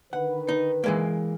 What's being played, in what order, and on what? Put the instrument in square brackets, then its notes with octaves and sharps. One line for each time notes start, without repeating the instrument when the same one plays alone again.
[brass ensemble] D3 D#3 B4 [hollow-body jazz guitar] F#5
[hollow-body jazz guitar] D#4
E3 G#3 A#3